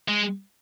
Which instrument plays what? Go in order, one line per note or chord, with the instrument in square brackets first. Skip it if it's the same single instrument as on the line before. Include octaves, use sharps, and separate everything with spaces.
[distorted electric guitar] G#3